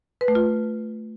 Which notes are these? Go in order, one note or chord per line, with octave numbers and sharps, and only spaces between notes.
B4
A3
F4